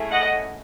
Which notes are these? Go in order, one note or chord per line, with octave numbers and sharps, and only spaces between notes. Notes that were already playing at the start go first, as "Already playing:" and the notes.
Already playing: A3 C#4 E4 G#4
D#5 F#5